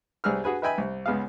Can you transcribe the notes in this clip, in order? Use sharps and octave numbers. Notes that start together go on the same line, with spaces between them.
C2 G3 G#4 B4 E6 F6
F#4 G#4 B4 G#5
B4 D#5 E5 G5 G#5 B5
C2
C#2 B3 G#4 F5